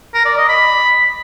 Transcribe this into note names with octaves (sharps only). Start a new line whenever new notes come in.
A#4
D5
D#5
B5